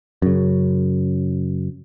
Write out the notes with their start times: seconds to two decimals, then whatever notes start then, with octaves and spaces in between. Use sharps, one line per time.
0.22 F#2 C#3